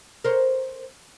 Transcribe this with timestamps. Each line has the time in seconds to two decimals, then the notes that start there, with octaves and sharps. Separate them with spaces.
0.24 A#4 C5 C#5